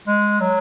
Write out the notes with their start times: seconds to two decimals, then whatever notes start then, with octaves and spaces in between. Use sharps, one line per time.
0.07 G#3
0.40 F#3